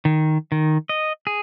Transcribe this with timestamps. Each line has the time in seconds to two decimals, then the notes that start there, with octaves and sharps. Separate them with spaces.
0.05 D#3
0.52 D#3
0.89 D#5
1.27 G#4